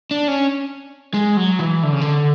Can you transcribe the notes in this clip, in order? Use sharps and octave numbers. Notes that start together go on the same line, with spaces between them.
D4
C#4
G#3
F#3
E3
D3
C#3
D3